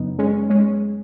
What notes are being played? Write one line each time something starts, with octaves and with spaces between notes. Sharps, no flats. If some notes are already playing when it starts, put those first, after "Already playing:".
Already playing: F#2 C#3 F#3 B3 D#4
G#3 C#4
G#3 C#4